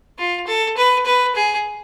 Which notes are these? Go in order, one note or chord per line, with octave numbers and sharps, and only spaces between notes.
F4
A4
B4
B4
G#4